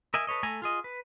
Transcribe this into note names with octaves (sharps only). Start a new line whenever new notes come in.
A#4 D#5 E5 G#5
A4 B4 C#5 D#5
A3 A4 G#5 A#5
F4 G#4 D#5
B4